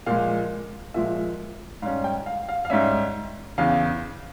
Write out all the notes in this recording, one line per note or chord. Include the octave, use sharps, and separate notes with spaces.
A#2 F3 G#3 F5
A#2 F3 G#3 E5
G#2 G3 C#4 F5
G5
F5
F5
F5
G#2 G3 C#4 E5
E2 C#3 E3 F5